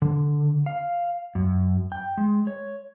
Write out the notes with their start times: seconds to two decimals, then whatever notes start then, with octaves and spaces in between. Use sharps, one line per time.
0.02 D3
0.66 F5
1.35 F#2
1.92 G5
2.17 G#3
2.47 C#5